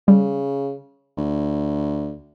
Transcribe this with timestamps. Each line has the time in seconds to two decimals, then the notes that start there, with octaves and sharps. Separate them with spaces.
0.08 C#3 G3
1.17 D2